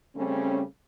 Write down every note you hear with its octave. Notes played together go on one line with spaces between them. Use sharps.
C#3 G3 A3 C4 C#4